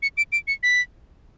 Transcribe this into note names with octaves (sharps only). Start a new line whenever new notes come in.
C#7
D7
D7
C#7
B6